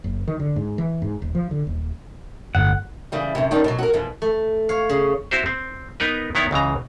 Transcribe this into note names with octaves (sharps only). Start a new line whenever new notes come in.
F#1
D#3
D3
G#2
E3
G#2
D#1
F3
D3
D#1
G1 A2 F#5
C#3 E3 G3
F#2 C3
D#3 G3 C#4 D4
B2 F#3
F#4 A#4
F2 B2 E3
A3
C#5 F5
C#3
C4 E4 F#4 G4 C5
C4
B3 D#4 A#4 B4
D#3 B3 E4 C#5 D5
C#2 C#3 E3 A#5